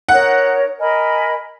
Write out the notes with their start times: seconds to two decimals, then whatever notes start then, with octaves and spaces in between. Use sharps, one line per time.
0.08 D#4 A#4 C#5 F#5
0.78 A#4 D#5 G#5 B5